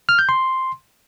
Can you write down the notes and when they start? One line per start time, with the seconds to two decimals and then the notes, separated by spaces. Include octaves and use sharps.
0.09 F6
0.19 G6
0.29 C6